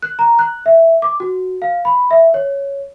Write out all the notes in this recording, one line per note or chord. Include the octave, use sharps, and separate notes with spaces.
F#6
A#5
F#6
E5
D6
F#4
F5
B5
E5
C#5